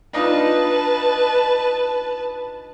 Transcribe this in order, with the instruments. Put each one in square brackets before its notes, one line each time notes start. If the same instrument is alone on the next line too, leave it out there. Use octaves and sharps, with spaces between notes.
[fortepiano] D4 D#4 F4 [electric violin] B4 A5